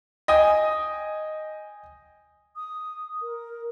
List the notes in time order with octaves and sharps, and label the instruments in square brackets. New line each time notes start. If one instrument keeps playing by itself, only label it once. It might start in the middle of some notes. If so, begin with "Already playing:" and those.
[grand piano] D#5 G5 G#5 D#6
[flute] D#6
A#4